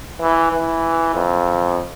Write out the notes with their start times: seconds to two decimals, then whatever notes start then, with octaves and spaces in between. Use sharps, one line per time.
0.21 E3
0.52 E3
1.14 F2